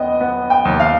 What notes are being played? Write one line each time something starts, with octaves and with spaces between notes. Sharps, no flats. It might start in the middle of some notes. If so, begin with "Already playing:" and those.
Already playing: D#2 B3 D#5 G5
B3
G5
D#2
F5